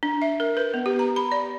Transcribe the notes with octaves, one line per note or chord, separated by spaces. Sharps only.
D4
E5
A#4
B4
B3
G4
A#5
B5
D5